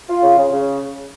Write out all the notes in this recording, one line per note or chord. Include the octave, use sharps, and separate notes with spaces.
F4
C#3
C#3
C#3